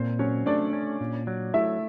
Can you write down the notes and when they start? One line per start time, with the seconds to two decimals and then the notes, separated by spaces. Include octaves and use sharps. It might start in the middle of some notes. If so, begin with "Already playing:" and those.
Already playing: A#2 C4 C5
0.19 F#3 C#4 C#5
0.46 A3 D4 D5
0.73 C#4
1.01 A#2
1.27 F#3
1.54 A3 E4 E5